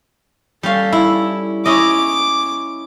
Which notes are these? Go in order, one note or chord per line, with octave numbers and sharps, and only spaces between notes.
G3 C#4 A4 F5
E4
C#4 E4 D#5 D6